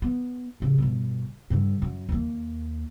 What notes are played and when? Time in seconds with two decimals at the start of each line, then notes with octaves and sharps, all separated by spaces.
0.02 B3
0.60 A2 C#3
0.78 G1 B2
1.50 G2 D3
1.82 F#2
2.09 D#2 A#3